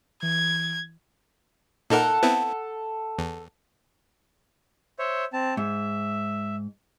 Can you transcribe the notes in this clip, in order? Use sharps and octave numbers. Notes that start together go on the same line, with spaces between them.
E3 G#6
A#2 D#4 A4 A#4 F#5
B3 C4 E4
E2
C5 C#5 E5
C4 A5
G#2 E5